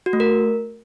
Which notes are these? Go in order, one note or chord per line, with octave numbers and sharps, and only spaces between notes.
F#4
A3
A#4